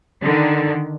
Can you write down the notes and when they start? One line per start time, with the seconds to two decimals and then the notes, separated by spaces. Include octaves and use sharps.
0.22 D3 D#3